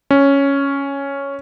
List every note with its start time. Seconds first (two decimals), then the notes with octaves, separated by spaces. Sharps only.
0.11 C#4